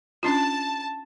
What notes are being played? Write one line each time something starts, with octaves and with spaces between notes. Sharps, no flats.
C#4 D4 F4 A5